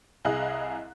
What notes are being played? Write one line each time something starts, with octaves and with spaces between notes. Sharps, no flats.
C2 E4 G#4 D#5 F5 F#6